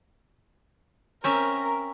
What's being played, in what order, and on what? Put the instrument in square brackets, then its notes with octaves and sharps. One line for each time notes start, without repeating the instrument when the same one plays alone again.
[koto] C4 C#4 E5 [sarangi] A#4